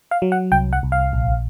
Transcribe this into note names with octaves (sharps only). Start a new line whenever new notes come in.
F5
F#3
F#5
C2 G5
F#5
C2
F5
A#1